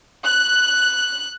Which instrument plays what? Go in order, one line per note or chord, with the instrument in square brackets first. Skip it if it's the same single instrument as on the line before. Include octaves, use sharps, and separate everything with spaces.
[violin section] F#6